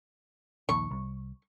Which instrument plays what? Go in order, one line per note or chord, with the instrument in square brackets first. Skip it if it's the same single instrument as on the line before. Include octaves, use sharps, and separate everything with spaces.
[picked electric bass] A#1 D#2 [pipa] C#6
[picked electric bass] C2